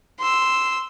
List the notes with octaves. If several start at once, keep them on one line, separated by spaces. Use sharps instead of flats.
C6 E6